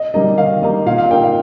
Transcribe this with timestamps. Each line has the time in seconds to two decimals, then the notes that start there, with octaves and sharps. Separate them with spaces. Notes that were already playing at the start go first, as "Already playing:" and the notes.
Already playing: D#5
0.14 G3 A#3 D#4 D#5
0.38 D#3 F5
0.62 G3 A#3 D#4 D#5
0.86 A#2 F5
0.98 F5
1.11 A#3 D#4 G5
1.23 F5